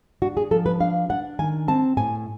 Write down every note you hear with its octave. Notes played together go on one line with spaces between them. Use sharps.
D4 F#4
G#4
F3 A4
B4
D4 F5
D4 F#5
D#3 G#5
C4 A5
A2 G#5